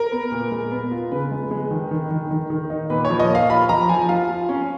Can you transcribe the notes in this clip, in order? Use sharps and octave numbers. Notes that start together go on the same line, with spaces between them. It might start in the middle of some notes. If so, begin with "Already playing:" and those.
Already playing: A#4
B3
A#2
G#3
B3
F4
C#3 B4
G#3
G#3
D#3
D#3
D#3
D#3
D#3
D#4
A#2 B4
C#5
F3
D#5
A#3
F5
F4 B5
F3 A#5
F3 G#5
F4 F5
F4
C#4